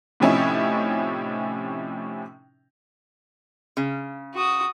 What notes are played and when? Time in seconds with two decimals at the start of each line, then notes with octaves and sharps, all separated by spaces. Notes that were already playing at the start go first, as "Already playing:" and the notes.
0.20 A2 C3 F3 C#4 D#4 E4
3.77 C#3
4.35 F#4 D#6